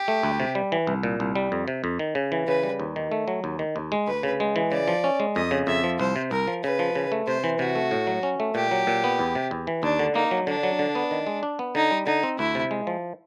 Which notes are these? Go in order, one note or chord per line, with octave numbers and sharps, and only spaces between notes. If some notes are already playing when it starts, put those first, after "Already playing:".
Already playing: G4
A3
D2
C3
G3
E3
C2
A#2
C2
G3
F2
C3
F2
D#3
C#3
E3
C#3 B4
G3
D#2
D#3
A3
F#3
D#2
D#3
D#2
G#3
D2 B4
C#3
G#3
E3
C#3 D5
F3
C#4
G#3
F2 D#5
C#3
F2 E5
F3
C2 C5
C3
C2 A#4
F3
C#3 B4
F3
C#3
A3
C3 C5
E3
C3 F#4
A3
A2
F#3
C#4
A3
A#2 G4
F#3
A#2
B3
E2
C3
E2
E3
D#2 D4
D3
A#3 D#4
F#3
D3 D4
F#3
D3
B3
D#3
G#3
D4
B3
D3 D#4
G3
D3 D#4
C4
D2 E4
C3
G#3
F3